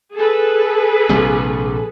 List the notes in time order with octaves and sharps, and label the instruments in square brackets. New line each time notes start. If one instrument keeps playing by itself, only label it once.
[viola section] G#4 A4 B4
[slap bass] A#1 C3 G3